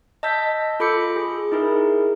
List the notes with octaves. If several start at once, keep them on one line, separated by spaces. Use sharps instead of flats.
D#5 A5 E6 G6 B6
F4 A4 B5 D6 G6 C#7
G#4
D#4 E4 G#4 A#4